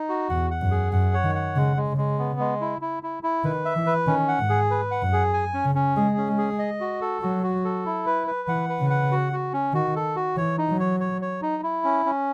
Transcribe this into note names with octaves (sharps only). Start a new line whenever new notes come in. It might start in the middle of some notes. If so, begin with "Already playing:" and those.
Already playing: D#4
F#4
E2 F#5
F#5
F#2
G#4
F#2 F#5
C#5
D#3
F#5
C#3 G#3
G#3
C#3
G#3
B3
G#3
E4
E4
E4
E4
D#3 B4
E5
E3
B4
D#3 C#4
F#5
G#2
G#4
B4
F#5
F#2
G#4
G#5
C#4
C#3
C#4
G#3 G#4
C#4
G#3
G#4
D#5
F#4
A4
F#3 F#4
F#4
A4
E4
B4
B4
E3 F#5
B4
C#3
F#5
F#4
F#4
C#4
D#3 F#4
A4
F#4
E3 C#5
D#4
F#3
C#5
C#5
C#5
D#4
E4
C#4
C#4